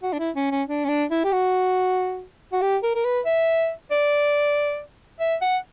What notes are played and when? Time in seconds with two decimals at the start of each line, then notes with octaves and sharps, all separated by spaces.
0.03 F#4
0.13 D4
0.19 E4
0.35 C#4
0.51 C#4
0.68 D4
0.85 C#4
0.89 D4
1.11 E4
1.24 G4
1.32 F#4
2.53 F#4
2.62 G4
2.83 A#4
2.95 A#4
3.05 B4
3.25 E5
3.91 D5
5.20 E5
5.42 F#5